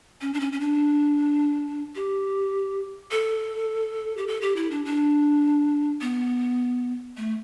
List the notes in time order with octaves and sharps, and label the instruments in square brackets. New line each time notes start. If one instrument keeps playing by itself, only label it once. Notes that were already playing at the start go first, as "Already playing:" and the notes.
[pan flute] C#4
D4
C#4
C#4
D4
G4
A4
G4
A4
G4
E4
D4
D4
B3
A3